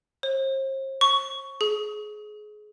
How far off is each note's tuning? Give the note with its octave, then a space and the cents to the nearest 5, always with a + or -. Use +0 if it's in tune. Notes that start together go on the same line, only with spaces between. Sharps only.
C5 +40
C#6 +10
G#4 +25